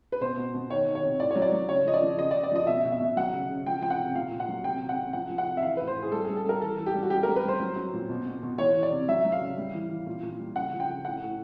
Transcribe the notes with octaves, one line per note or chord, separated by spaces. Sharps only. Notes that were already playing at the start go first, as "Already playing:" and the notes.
B4
B2 C5
B2
B2
D#3 C#5
D#3
C#5
C3
A2 D5
F#3 C#5
D5
F#3
C#3 C#5
F3 D#5
D5
F3
C#3 D#5
C#3 D5
D5
F3 D#5
B2 E5
B2
E5
B2
F#3 F#5
C#3
C#3
F3 G5
F3 G5
F#5
C3
A#2 F5
A#2
F#5
F#3
C3 G5
C3
F#5
C3
F3 F#5
F3
F#5
C3
E5
E3 F5
A2 B4
C5
A2
G#4
G3 A4
G3 G#4
A4
G3 A#4
E3 A4
E3
G4
G3
F#4
G3 G4
G3 A#4
B4
G3 C5
F#3
F#3
A#2
B2
B2
B2
E3 C#5
E3
D5
C3
F#3 E5
F#3
F5
C#3
G3
E3
E3
A#2
A#2
G3
C#3 F#5
F3
G5
C#3
A2 F#5
A2